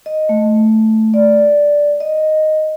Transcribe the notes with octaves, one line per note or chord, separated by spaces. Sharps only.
D#5
A3
D5
D#5